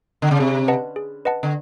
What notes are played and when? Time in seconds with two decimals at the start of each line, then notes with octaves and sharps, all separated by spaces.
0.22 D3
0.31 C#3
0.39 C3 G#4
0.68 B4 D#5 F#5 A5
0.96 G#4
1.25 B4 D#5 F#5 A5
1.43 D3